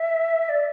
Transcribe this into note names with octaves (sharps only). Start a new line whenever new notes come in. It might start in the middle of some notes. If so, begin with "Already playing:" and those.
Already playing: E5
D5